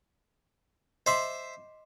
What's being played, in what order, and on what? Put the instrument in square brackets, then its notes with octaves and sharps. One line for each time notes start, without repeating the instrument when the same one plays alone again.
[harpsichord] C5 E5 [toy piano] D#5 C6 D6